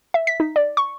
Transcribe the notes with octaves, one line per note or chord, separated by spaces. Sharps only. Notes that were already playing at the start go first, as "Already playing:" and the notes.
E5
B6
D#4
D5
C#6